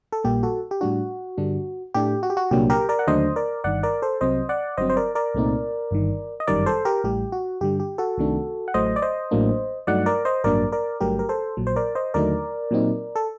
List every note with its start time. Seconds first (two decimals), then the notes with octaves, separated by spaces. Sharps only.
0.12 A4
0.24 A#1 A#2 G3 A#3 G4
0.43 F#4 A4
0.71 G4
0.81 A2 G3 D4 F#4
1.38 G2 D3 G3 D4
1.94 A2 A3 D4 G4
2.23 F#4
2.30 G4
2.37 F#4
2.51 C2 A#2 F#3 A#3 D4 G4
2.70 G4 A#4
2.89 A#4 D5
2.99 F#5
3.07 D#2 D3 F#3 A3 D4 C5 D#5
3.36 A#4 D5
3.64 G1 G2 D#3 D5 F#5
3.83 A#4 D5
4.02 A4 C5
4.21 C2 C3 F#3 C4 C5 D#5
4.49 D5 F#5
4.77 G1 G2 F#3 C4 C5 D#5
4.90 C5
4.97 A#4 D5
5.15 A#4 D5
5.34 C2 A#2 A3 C4 D#4
5.91 G1 G2 D#3
6.40 D#5
6.47 G1 F#2 D#3 G3 A#4 D5
6.66 A4 C5
6.85 G4 A#4
7.04 A1 A2 G3 G4
7.32 F#4
7.61 G2 D3 G3 G4
7.80 G4
7.98 F#4 A4
8.18 C2 C3 D#3 A3 D4
8.68 F#5
8.74 A1 A2 F#3 A3 C5 D#5
8.96 D5
9.02 C5 D#5
9.31 A1 A2 F#3 A#3 D4
9.87 G2 F#3 A3 D#4 D5 F#5
10.06 A#4 D5
10.25 C5 D#5
10.44 A1 G2 F#3 A#3 D4 A#4 D5
10.72 A#4 D5
11.00 G1 G2 F#3 A3 G4 A#4
11.19 A#4
11.29 A4 C5
11.57 A#1 A#2 F#3
11.67 C5
11.76 A#4 D5
11.95 C5 D#5
12.14 D#2 D3 F#3 A3 D#4 A#4 D5
12.71 A#2 F#3 C4 D#4
13.16 A4